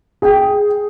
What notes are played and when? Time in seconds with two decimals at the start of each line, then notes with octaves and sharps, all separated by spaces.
0.22 G#4 G5